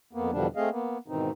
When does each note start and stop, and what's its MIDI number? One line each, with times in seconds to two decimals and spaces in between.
0.13 0.31 41
0.13 0.31 58
0.13 0.31 59
0.32 0.47 40
0.32 0.47 47
0.32 0.47 50
0.32 0.47 53
0.32 0.47 55
0.32 0.47 62
0.56 0.69 57
0.56 0.69 60
0.56 0.69 68
0.56 0.69 75
0.56 0.69 77
0.71 0.97 58
0.71 0.97 59
1.08 1.31 44
1.08 1.31 47
1.08 1.31 51
1.08 1.31 52
1.08 1.31 60
1.08 1.31 63